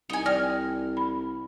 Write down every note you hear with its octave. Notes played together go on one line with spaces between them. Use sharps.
C2 D#4 G#5
D5 G5 F6
B5